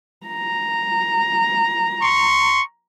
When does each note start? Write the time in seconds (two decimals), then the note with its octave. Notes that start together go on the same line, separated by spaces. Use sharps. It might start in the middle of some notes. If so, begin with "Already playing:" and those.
0.27 A#5
2.01 C6 C#6